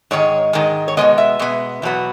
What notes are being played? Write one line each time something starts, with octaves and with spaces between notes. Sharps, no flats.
G#2 D#3 G#3 C#5
G#2 D#3 G#3
C#5
B2 G#3 B3 D#5
E5
B2 G#3 B3
E2 B2 F#3 B3